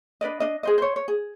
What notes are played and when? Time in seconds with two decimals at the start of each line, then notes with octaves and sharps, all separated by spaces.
0.21 D4 B4 D5 D#5
0.40 D4 D#5
0.63 G#4 C5 D#5
0.78 C5 C#5
0.96 C#5
1.08 G#4